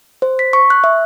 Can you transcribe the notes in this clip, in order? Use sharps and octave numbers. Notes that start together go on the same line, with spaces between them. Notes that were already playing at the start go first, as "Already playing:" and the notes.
C5
B6
C#6
F#6
E5